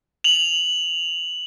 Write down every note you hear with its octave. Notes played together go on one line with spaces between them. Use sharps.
F7 F#7